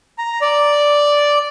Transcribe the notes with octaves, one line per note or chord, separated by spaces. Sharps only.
A#5
D5